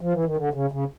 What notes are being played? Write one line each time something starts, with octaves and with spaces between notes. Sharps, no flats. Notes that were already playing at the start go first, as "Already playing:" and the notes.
F3
E3
D#3
D3
C#3
C#3